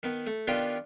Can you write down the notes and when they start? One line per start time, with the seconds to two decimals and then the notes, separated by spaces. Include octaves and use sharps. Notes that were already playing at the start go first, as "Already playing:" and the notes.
0.03 D#3 B3
0.27 A3
0.48 D#3 B3 D4 F4 G4